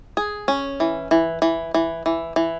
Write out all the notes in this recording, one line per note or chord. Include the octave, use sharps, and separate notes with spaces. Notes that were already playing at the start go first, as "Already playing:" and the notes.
G#4
C#4
E3
E3
E3
E3
E3
E3